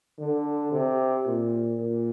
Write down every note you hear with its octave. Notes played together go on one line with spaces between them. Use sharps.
D3
C3
A#2
A#2